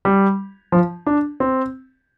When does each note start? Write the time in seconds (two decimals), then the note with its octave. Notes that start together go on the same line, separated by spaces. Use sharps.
0.05 G3
0.72 F3
1.06 D4
1.40 C4